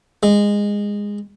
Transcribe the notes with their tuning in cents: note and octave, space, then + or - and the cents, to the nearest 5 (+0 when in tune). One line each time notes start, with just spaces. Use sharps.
G#3 -15